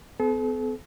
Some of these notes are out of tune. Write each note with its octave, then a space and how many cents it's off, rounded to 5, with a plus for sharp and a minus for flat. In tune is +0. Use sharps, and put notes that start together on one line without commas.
B3 +45 A4 -40